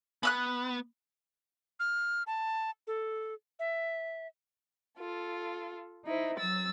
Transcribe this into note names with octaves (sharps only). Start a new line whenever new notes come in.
B3 B5 E6 F#6
F6
A5
A4
E5
F4 A4
D#4 E4 C5
F#3 E6 A6